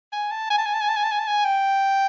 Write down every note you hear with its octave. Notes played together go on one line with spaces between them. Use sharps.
G#5
A5
G#5
A5
G#5
A5
G#5
A5
G#5
A5
G#5
A5
G#5
G5